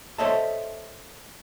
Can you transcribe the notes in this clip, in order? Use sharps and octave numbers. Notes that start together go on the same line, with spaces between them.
A4 C5 C#5 D#5 E5 A5